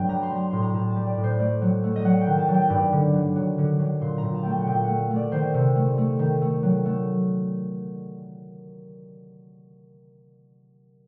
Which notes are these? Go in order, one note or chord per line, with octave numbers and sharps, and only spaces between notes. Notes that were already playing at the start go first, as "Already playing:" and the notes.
Already playing: G2 F#3 A3 G5
G3 A#5
C6
G3 A#5
A2 C6
A#5
A2 A5
A5
G3
D5
A2
C5
A3 D5
F#3
A3
D#5
F#3 F#5
G5
D#3
A5
F#3
G5
G2 D5
D3
F#3
F#3
D3
F#3
A#2 C6
A#5
A#2
A5
A3 G5
A5
F#5
A#2 G5
A3 F#5
A3
D5
D#3 C5
C3
A3
A3
D#3
A3
F#3
A3